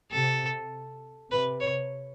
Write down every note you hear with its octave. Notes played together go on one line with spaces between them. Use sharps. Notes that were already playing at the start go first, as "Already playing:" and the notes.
C3 A4
C3 B4
C#5